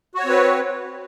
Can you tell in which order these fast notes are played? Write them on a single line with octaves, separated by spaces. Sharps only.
F#4 C#5 C4 B4